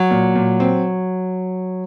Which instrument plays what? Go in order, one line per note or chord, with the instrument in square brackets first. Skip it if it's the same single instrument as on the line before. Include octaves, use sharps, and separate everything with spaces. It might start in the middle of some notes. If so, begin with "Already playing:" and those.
Already playing: [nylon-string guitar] F#3
[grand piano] A#2
A#2
C4